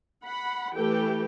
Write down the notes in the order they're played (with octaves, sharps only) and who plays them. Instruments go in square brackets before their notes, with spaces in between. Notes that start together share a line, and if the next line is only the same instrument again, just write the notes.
[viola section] F#5 B5
E3 A3 G4 A4 B4 G5